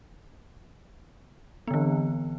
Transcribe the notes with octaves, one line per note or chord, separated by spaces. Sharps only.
D3 E3 B3